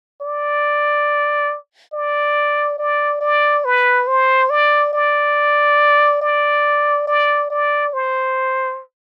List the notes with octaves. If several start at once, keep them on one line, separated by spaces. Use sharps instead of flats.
D5
D5
D5
D5
B4
C5
D5
D5
D5
D5
D5
C5